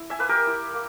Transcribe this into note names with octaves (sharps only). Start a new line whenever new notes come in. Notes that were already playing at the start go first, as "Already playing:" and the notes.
Already playing: E4
E5 G#5
A#3 B4
G4 A#4
E4
A#3